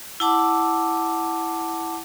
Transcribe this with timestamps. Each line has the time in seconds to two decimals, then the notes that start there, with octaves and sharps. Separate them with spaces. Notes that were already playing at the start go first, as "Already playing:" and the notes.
0.20 E4 F#5 A5 D6